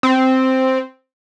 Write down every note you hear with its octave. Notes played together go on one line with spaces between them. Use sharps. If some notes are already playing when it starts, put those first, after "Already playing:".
C4